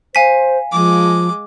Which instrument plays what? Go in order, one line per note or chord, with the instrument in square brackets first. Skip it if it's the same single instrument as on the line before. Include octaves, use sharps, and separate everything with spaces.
[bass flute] C5 [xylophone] F5 G#5 B6
[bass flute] F3 [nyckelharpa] G#3 D6